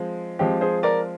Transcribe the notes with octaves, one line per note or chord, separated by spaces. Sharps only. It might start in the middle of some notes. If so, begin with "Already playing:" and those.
Already playing: F3 G#3 C4
F3 G#3 C4 G4
G#4 C5
A#4 D5